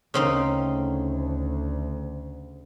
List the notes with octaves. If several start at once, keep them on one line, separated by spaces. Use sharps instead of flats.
D2 C#3 C4 D#4